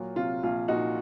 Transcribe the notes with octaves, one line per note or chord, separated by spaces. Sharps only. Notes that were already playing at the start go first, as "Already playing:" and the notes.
Already playing: A#2 F#3
C3 F4
A#1 F4
A#2 D#4 F#4